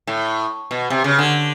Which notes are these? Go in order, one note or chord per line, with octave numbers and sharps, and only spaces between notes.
A2
B2
C3
C#3
D3